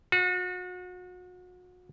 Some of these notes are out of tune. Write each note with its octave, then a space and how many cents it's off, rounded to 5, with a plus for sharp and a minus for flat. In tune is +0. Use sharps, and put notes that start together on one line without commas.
F#4 -35